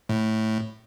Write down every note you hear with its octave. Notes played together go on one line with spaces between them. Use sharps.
A2